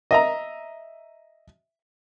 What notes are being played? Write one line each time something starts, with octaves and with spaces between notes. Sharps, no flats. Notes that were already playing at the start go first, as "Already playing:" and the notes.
D#5 E5 A#5